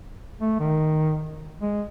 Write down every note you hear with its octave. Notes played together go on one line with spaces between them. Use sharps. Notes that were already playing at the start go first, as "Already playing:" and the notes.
A3
D#3
G#3